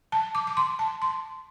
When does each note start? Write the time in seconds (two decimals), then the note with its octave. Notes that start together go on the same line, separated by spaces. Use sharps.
0.12 A5
0.35 D6
0.47 D6
0.57 C6
0.79 A5
1.02 C6